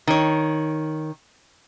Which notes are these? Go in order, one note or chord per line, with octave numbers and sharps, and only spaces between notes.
D#3 C#5